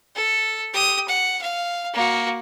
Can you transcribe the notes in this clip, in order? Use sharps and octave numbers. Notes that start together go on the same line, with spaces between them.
A4
G4 D#6
F#5
F5
A#3 F#4